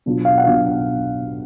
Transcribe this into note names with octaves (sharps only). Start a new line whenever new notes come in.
B2 F#3 D4 F4
F5
F#5
B2 F#3 D4 F4 F5